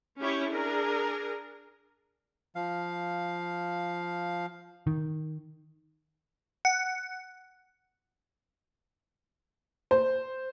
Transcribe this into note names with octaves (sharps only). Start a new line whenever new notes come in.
C#4 E4 G4 C#5
D4 G#4 A#4
F3 F5
D#3
F#5
C5